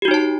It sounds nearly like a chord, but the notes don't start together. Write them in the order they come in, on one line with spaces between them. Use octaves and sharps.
G4 F#4 D#4 C#5 A5